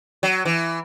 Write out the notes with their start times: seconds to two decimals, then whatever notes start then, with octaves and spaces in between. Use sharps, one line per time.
0.23 F#3
0.45 E3